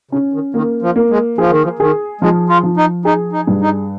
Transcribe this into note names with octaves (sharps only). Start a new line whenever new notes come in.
C#3 C#4
D#3
D#3 A#3
F3
A#3
G#3
F3 G#4
D#3
F3
D#3 G#4
F3 G#3
F4
F3
D#4
D#4 G#4
D#4
G2
D#4